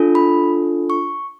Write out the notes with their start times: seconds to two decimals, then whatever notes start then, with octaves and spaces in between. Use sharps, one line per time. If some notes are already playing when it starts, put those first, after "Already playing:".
Already playing: D4 F4 A4
0.15 B5
0.90 C#6